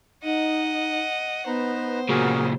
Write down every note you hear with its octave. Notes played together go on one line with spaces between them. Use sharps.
D#4 D#5 F#5
B3 D#4 B4 C5 A#5
A#2 C#3 F#4 G#4 A#4